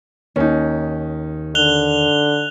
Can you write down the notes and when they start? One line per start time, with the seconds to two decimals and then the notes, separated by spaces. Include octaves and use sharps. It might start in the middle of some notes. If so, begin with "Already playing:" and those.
0.36 D#2 C#4 D#4
1.55 D3 F#6 F7 G7